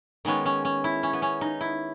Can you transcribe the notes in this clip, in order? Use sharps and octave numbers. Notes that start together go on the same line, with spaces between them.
D#3 G#3 B3 C#4
C#4
C#4
E4
C#4
B3
C#4
D#4
E4